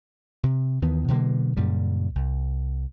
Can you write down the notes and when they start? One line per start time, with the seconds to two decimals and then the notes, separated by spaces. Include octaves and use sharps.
0.43 C3
0.82 D#2 D#3 E3 B3
1.08 B2 D3 F#3 A#3
1.57 F#2 A#2 C#3 G3
2.15 C2